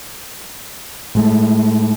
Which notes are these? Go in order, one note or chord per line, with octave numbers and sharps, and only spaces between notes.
A2 G#3 A3